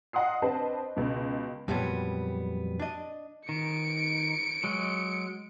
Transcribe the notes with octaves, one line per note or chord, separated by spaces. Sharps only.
D#5 F5 F#5 C6 D#6 C7
C4 D4 B4 C5 D#5 A5
C#2 B2
F2 A#2 F#3 G3 B3
D4 D#5
D#3 C#7 D7
F#3 G#3